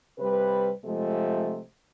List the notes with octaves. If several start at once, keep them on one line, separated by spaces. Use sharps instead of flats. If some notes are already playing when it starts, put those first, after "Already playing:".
C3 G3 B4
C3 F3 G#3 A3